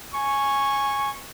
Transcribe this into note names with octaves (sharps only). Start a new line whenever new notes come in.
G#5 C#6